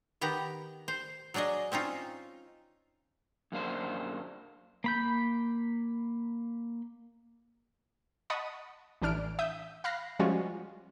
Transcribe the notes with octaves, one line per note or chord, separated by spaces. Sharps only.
D#3 B3 G4 A#5
C5
F#3 D4 G#4 D5 D#5
C4 C#4 D#4 F4
F#2 A#3 D4 C5
A#3 B5 G6
D#5 F#5 A5 B5 C#6 D#6
A1 E3 D4 F6 D7
E5 D#6 G6
F5 B5 F#6 A#6 C7
F3 G3 G#3 C#4 F4 F#4